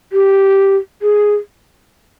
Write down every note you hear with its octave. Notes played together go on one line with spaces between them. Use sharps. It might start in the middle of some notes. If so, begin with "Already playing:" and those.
G4
G#4